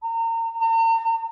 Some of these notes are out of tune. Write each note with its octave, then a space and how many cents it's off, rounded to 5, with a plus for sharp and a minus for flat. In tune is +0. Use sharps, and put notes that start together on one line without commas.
A#5 -35
A#5 -45